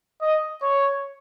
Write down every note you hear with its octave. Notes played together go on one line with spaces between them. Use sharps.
D#5
C#5